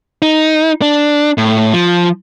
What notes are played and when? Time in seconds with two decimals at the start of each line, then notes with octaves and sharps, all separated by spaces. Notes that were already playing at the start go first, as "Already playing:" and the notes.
0.22 D#4
0.82 D4
1.38 A2
1.73 F3